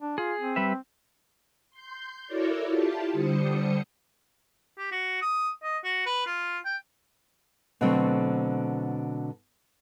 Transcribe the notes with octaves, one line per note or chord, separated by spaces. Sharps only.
D4
F4 G#4
C4
G3 B4 E5
C6 G6
E4 F#4 A4 A#4 C#5 D5
E4 F4 G4 A5
D3 G3 C5 D#6 C#7
G4
F#4
D#6
D#5
F#4
B4
F4
G5
B2 D3 F#3 A3 C4